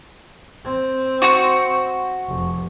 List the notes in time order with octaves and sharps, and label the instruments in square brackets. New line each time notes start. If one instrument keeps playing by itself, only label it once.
[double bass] C4
[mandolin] F#4 C#6
[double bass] F1